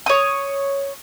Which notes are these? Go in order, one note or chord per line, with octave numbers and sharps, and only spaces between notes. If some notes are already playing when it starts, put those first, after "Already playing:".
C#5 D#6